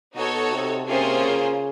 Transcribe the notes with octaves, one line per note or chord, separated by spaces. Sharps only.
B2 D#4 F#4 A4 C#5
C3
C3 A#3 C#4 F4 G#4 C5
C#3